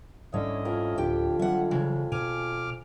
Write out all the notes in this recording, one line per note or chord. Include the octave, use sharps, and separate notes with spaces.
G#2 D3 F3 G3 C#4 E4 C#5 D#5
F2 A#4
D1 D3 F3 G4 G5
F#3 G3 C4 E5 F#5
C#3 E3 G#3
B2 G#5 D6 F6